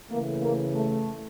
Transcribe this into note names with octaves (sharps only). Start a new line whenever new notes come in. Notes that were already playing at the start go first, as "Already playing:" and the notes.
C#3 E3 A3 A#3
A#3
A3